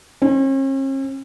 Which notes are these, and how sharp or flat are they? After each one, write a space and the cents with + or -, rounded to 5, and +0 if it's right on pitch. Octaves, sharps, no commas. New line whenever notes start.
C#4 -45